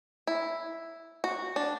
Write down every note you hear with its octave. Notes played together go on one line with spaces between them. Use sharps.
E4
F#4
D4